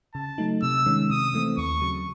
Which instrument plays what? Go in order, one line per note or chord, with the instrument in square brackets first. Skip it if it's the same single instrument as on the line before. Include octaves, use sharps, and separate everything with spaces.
[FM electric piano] C#3 [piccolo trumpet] A5
[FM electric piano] F#3 A3 D#4
[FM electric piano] C3 [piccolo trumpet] E6
[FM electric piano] D#3 G#3 C#4
[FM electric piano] C3 [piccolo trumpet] D#6
[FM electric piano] E3 A3 C4
[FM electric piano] D#2 [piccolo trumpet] C#6
[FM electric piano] C#3 F#3